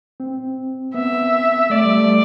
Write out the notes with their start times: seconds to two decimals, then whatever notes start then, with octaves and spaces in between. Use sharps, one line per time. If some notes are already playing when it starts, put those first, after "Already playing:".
0.20 C4
0.94 B3 E5
1.70 A3 D5
1.84 G3
1.98 A3